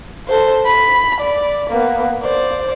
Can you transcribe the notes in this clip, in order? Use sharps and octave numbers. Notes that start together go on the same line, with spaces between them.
A4 C5
B5
D5
A#3 B3
C5 D5